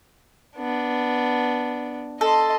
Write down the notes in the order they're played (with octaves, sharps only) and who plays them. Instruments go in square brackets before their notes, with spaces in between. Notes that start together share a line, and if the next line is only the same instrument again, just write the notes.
[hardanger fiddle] B3 D4
[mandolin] A4 [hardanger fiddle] D#5 C6